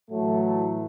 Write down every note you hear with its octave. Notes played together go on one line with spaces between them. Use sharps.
A2 E3 F#3 A3